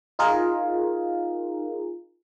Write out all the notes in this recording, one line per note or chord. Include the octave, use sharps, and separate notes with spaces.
D#4 F4 G#4 A#4